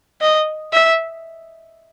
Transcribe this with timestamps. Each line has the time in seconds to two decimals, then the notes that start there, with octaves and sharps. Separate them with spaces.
0.21 D#5
0.73 E5